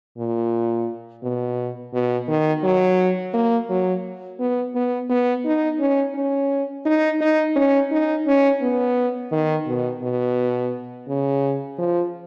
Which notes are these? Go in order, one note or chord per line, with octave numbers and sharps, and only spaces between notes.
A#2
B2
B2
D#3
F#3
A#3
F#3
B3
B3
B3
D#4
C#4
C#4
D#4
D#4
C#4
D#4
C#4
B3
D#3
B2
B2
C#3
F3